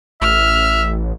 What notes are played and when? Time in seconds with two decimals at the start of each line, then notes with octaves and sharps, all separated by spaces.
0.21 A1 E5 F6